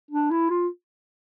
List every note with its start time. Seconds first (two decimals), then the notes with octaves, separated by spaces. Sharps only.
0.11 D4
0.30 E4
0.50 F4